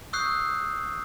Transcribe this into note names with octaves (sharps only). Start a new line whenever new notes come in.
C#6 D#6 E6 F#6 G6 C7